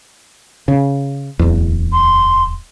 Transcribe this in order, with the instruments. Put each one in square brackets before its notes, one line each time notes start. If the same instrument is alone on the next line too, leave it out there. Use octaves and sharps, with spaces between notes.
[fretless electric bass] C#3
D1 E2
[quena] C6